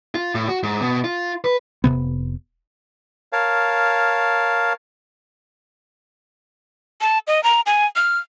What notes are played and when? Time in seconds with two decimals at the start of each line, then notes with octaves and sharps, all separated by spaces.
0.15 F4
0.35 A2
0.48 F#4
0.63 G#2
0.81 B2
1.04 F4
1.44 B4
1.84 F1 F#2 C3 B3
3.33 A#4 C#5 F5 A5
7.01 A5
7.27 D#5
7.43 A#5
7.66 G#5
7.96 F6